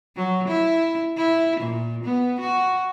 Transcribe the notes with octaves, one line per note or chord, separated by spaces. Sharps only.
F#3
E4
E4
A#2
B3
F#4